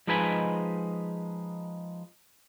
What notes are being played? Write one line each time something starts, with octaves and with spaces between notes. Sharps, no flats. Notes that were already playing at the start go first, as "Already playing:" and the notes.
F3 G#3 D#4 B4 G#5 B5